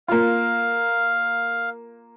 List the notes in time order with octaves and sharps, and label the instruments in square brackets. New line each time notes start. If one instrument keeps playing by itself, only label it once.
[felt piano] A#3 F4 [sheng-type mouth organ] F5